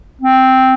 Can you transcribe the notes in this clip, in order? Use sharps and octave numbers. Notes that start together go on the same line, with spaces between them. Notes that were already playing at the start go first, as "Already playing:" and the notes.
C4